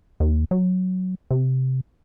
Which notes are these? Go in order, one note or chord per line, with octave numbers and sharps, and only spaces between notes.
D#2
F#3
C3